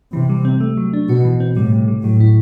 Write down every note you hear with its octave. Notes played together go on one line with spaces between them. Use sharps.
C3 E3
G3
C4
A3
F#3
D4
B2 F#4
E3
C4
A2 G3
C3
G3
A2 F#3
E4